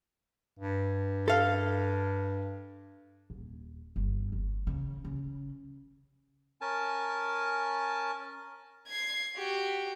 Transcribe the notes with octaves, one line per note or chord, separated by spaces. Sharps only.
G2
A4 F5
D#1
G1
D#3
C#3
C#3
C#4 A#4 G#5 A5
G#6 C7
F#4 G4